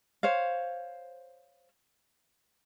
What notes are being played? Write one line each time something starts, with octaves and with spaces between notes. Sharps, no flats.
C5 C#5 F5